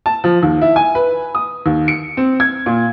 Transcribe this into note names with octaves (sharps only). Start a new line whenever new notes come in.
A5
F3
D#2
E4
G#5
B4
D#6
D#2
C#7
C4
G#6
A#2